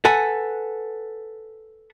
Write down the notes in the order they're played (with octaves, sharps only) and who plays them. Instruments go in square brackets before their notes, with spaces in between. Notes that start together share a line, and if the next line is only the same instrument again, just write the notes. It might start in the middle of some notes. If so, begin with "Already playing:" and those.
[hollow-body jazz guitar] A4 B4 F#5 G#5